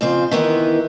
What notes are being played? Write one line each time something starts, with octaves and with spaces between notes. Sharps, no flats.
F2 C#3 C5
D#3 E3 B3